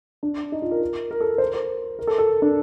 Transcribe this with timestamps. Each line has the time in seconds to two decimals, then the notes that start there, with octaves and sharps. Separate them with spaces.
0.23 D4
0.52 D#4
0.62 F4
0.71 A#4
0.82 A#4
1.11 A#4
1.21 A4
1.38 C5
1.46 A#4
1.54 C5
1.99 A#4
2.07 A4
2.18 A4
2.42 D4